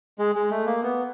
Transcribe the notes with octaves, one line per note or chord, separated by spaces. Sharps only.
G#3
G#3
A3
A#3
B3